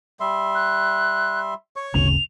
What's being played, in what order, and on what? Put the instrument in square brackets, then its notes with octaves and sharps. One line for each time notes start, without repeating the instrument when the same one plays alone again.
[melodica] G3 E5 C6
[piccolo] F#6
[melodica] C#5 C#6
[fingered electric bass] G1 D2 C#3 [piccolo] F7